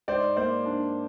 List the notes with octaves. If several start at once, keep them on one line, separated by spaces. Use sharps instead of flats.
G#2 C5 D5
A#3 C5 D5
D4